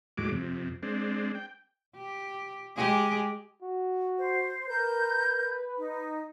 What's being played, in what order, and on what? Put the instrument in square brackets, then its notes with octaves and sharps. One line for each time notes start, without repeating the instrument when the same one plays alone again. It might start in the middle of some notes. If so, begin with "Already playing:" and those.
[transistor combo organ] D#2 A2 F#3 G#3 D6
F2 C3
G#3 C4 D4
G5
[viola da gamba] G4
G#3 G4 G#4
[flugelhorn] F#4
[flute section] C5
[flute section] A#4 G6 [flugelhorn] B4
[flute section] D#4